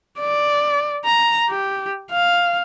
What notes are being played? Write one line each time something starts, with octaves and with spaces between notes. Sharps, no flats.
D5
A#5
G4
F5